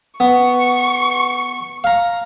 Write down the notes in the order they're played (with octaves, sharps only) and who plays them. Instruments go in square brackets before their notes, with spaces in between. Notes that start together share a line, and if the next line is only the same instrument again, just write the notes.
[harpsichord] B3 [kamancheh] C#6
[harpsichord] F5 A#5